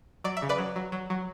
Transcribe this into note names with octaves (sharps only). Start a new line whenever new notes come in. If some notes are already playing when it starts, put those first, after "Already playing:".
F#3 D5
E5
C#3
B4 D5
F#3
F#3
F#3
F#3